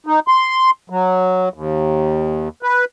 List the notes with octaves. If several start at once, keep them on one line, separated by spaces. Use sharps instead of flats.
D#4
C6
F#3
D#2
B4